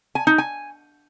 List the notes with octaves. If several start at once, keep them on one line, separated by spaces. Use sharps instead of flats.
G#5
D#4
G#5